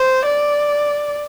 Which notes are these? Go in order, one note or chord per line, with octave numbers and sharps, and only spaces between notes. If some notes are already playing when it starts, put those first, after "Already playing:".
Already playing: C5
D5